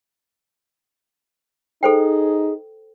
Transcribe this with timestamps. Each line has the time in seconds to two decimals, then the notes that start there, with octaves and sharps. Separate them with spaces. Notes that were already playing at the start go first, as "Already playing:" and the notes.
1.83 D#4 G#4 A4 C5 G5